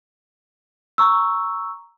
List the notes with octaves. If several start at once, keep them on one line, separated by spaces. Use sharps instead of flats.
A#5 C#6 E6